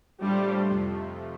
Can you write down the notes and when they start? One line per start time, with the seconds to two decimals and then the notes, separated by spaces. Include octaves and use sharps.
0.21 A2 G3 A3 D4 F4 C5
0.70 F2 C3 F3 A3